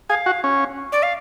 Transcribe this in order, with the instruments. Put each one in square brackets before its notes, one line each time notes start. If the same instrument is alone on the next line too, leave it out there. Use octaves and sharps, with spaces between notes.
[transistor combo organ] G#4 [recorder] F5
[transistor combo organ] F#4
C#4
[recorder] D5
F5